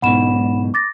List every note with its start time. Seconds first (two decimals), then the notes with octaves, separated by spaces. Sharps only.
0.02 B1 G#2 B2 F#5 B5 E7
0.74 D6 A6 A#6